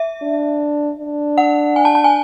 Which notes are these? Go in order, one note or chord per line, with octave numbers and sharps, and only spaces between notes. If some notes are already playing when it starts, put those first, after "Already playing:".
Already playing: E5
D4
D4
F#5
G#5
A5
A5
G#5